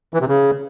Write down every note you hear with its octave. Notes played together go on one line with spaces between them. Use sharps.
E3
C3
C#3